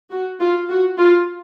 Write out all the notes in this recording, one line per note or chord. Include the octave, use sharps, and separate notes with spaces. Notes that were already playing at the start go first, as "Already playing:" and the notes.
F#4
F4
F#4
F4